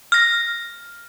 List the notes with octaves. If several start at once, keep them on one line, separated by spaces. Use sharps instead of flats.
F6 A#6